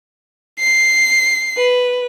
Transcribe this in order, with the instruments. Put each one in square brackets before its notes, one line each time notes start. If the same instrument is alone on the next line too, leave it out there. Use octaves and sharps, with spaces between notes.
[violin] C7
[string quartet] B4